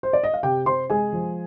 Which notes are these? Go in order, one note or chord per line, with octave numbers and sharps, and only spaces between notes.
C5
D5
D#5
F5
C3 G4 G5
C3 C5 C6
G#3 G#4 G#5
F3